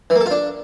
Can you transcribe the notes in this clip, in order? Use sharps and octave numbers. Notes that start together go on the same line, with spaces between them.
E3
A#3
A4
F4
D4